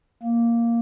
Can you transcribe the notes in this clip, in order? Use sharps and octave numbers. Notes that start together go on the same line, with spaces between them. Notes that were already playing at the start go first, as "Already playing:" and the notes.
A#3